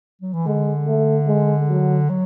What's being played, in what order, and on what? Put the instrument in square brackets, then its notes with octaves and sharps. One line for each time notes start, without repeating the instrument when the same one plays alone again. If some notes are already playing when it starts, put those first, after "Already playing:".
[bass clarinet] F#3
E3
[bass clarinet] D3 [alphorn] G#3
[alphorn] A3
G#3
F#3
[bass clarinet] F#3